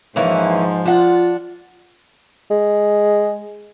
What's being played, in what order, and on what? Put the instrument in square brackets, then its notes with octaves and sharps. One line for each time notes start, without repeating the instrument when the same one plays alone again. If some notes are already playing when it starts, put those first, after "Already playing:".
[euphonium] G#2 [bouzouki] E3 A#3 C#4 [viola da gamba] F3
[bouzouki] D4 F#5 [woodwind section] F4
[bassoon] G#3